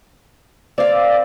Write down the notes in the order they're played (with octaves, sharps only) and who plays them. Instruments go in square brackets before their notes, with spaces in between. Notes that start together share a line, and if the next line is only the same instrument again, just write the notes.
[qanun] C4 F5 [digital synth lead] D5